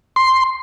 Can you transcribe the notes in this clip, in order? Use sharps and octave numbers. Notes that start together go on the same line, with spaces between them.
C6